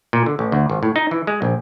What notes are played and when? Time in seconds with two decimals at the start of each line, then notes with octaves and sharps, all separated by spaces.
0.13 A#2
0.26 D3
0.39 A1
0.52 D2
0.70 G#1
0.83 A2
0.96 D#4
1.11 E3
1.27 G#3
1.42 A#1